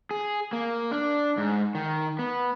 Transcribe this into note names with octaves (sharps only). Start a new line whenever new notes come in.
G#4
A#3
D4
G#2
D#3
B3